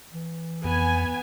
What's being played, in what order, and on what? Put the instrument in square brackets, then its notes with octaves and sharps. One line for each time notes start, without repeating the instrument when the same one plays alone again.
[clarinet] E3
[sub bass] F2 [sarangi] B3 [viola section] G#5